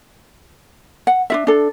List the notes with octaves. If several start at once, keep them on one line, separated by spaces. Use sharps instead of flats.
F#5
D4 F4 E5
D4 A4